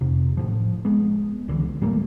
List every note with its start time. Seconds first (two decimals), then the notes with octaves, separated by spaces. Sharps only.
0.01 F2 C3
0.37 A2 F3
0.85 G#3 B3
1.48 C#2 D3 E3
1.81 G#2 G3 A3 A#3